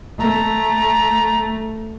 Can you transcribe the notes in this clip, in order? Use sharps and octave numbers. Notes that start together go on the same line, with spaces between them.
A3 A#5